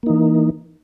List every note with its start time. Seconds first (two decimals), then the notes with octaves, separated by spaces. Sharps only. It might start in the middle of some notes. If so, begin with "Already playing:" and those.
0.03 A#3
0.06 D#4
0.10 E3